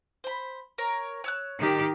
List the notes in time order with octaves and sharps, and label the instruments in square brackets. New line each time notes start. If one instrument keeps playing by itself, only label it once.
[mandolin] C5 B5
A#4 C#5
C#5 E6 F#6
[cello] D#3 G4